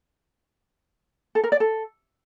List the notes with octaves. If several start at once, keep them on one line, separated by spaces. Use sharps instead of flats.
A4
A#4
D5
A4